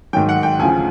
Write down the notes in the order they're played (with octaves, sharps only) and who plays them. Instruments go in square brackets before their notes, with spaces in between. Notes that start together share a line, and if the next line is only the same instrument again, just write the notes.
[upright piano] G#2 D#3 F#3 G5
F#5
G5
D2 C#3 F3 G#5